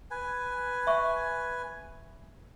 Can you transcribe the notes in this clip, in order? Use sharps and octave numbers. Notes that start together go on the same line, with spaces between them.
B4 G#5
E5 C#6